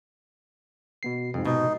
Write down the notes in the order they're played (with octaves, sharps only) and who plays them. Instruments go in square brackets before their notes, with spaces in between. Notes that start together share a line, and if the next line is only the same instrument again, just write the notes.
[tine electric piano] B2 B3 C7
[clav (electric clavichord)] F2 [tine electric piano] G#2 C3
[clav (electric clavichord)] B2 [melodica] D#4